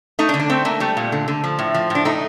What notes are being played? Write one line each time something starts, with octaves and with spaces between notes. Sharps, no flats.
A3 D#4
D4
D3
D4
A3 C4
A3 A#3
G3 A3
A#2
D3
D3
F3
A2
F3
A2 D4
A3 D#4